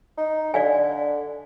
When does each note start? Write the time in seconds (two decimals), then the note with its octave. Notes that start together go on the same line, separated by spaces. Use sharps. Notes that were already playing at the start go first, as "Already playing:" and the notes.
0.18 D#4
0.54 D3 D5 F5 G#5